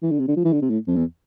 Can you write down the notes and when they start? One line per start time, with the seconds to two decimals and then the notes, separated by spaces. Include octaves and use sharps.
0.03 E3
0.11 D3
0.20 C3
0.28 D3
0.37 F3
0.45 E3
0.53 D3
0.62 C3
0.70 A2
0.88 F2
0.96 E2